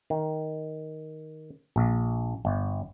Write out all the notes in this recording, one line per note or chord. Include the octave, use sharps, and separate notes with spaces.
D#3
A#1
G1